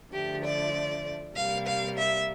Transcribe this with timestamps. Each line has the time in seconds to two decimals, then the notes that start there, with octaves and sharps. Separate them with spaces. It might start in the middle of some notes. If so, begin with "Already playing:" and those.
0.13 D3 F3 A3 G4
0.44 D5
1.36 C3 G3 A#3 F5
1.67 F5
1.98 E5